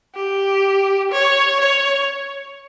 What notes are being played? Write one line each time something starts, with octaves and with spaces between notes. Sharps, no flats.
G4
C#5
C#5